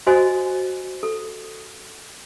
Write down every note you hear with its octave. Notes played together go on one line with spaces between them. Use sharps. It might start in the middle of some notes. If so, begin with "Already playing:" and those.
F#4 C5 D#5 G#5 D#6
A4